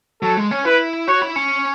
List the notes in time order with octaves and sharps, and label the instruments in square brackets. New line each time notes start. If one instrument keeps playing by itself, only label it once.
[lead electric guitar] F#3 [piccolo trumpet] A4
[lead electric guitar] G#3
C#4
[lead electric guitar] E4 [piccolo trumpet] B4
[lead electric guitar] F#4 [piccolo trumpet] C#5
[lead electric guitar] E4
C#4